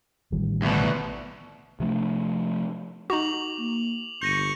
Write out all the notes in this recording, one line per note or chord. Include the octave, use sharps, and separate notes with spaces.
A1 D#3 G3
D2 B2
C3 F3 A3 D4
D#4 F#4 D6 F7 F#7
A#3
G1 C#6 G6 A#6 D#7